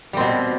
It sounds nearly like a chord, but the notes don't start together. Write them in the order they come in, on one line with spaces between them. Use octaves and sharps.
G3 C4 B2